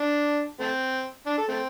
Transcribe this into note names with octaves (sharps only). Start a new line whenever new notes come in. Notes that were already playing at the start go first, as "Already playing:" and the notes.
Already playing: D4
A3 C4
D4
A4
A3 C4